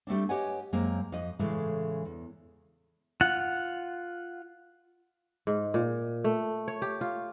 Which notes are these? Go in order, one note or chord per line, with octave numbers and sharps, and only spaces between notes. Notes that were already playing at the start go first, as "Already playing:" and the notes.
G3 A3 C4 D4
G4 B4 C#5 D#5 F#5 G#5
F#2 G#3 A#3 C4
F2 D#5
A2 C#3 E3 G#3 A3
E2
F4 F#5
G#2
A#2
A3
C#5
G4
F4